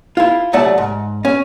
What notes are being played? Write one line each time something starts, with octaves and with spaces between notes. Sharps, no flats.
E4 F4
C2 F#3 A3 D5 F#5 A5
G#2
C#4